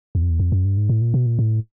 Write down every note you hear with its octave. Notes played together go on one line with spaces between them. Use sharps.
E2
F2
E2
F2
F#2
G2
G#2
A2
A#2
B2
A#2
A2